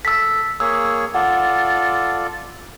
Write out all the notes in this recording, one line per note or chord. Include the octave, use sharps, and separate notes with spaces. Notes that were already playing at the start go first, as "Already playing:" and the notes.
A4 E6 B6
A#3 G#4 C#5 E6
F4 A4 D5 F#5